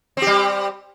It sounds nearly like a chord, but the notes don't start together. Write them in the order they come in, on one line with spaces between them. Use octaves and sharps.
C4 G4 G3